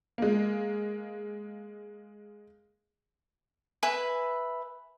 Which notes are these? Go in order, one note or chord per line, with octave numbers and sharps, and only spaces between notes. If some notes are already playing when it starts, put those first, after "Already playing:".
G#3 A#3
B4 E5 G#5 B5